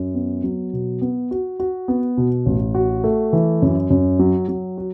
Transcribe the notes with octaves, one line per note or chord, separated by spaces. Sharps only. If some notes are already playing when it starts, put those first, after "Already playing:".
Already playing: F#2
B3
F#3
B2
B3
F#4
F#4
B3
B2
A1
F#4
A3
E3
F#2
F#2
F#3
F#3
F#4